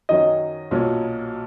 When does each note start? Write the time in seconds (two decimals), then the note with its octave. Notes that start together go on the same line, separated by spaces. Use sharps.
0.09 F#2 D#3 F#3 C#4 D#5
0.71 B1 A#2 F#3 C#4